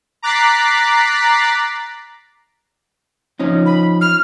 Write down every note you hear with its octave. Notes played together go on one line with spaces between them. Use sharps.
A#5 D6 F#6 A6 B6 C7
F3 C#4 D#4
B5
F6